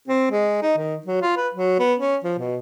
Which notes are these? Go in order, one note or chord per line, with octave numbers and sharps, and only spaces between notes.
C4
G#3
D#4
D#3
F#3
F4
B4
F#3
B3
C#4
F3
B2